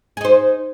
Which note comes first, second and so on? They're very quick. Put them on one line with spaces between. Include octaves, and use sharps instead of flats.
G#4 D#4 C5